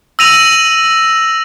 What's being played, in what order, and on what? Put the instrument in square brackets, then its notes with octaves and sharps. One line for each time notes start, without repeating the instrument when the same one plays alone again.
[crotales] E6 A#6 D#7 F7 F#7